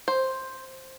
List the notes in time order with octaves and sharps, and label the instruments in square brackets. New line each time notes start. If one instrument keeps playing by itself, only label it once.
[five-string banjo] C5